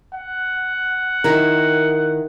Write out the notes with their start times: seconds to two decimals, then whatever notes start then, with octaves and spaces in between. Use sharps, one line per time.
0.15 F#5
1.24 D#3 E4 A#4